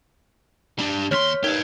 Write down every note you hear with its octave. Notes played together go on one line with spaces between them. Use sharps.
G3 D4
D#2 C#5 C6 F6 B6
D#4 G4 A#4 B4 G#6